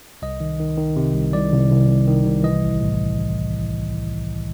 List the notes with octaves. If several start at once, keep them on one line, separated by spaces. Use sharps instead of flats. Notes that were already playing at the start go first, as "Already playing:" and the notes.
C2 D#5
D#3
D#3
D#3
C3
C2
C2 D5
C2
C2
C2
D#3
C2
E3 D#5
A1
A2